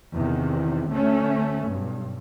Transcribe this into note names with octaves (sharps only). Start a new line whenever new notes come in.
E2 C3 D#3
D2 A3 C#4
B1 G2